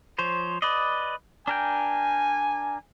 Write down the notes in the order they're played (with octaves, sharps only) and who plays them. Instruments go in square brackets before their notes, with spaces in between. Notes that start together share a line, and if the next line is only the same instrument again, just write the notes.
[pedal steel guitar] F3 C5 C#5
B4 D5 D#5
[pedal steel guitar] D4 A#4 G5 [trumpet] G#5